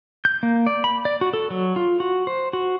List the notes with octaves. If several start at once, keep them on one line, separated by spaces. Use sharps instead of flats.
G6
A#3
D5
B5
D5
F#4
A4
F#3
F4
F#4
C5
F#4